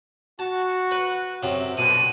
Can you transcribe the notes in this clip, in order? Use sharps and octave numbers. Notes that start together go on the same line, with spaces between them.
F#4 A5
B4
F#2 C3
G2 B2 D3 D#7